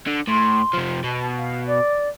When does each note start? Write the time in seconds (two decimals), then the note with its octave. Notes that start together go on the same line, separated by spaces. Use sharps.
0.07 D3
0.28 A2 C6
0.74 C3 F3
1.04 B2 A5
1.37 F5
1.66 D5